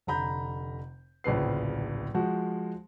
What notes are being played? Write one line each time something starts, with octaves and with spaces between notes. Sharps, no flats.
F1 D3 A#5 B5 G6
D1 A#1 C#3 B4 C7
F3 G#3 F#4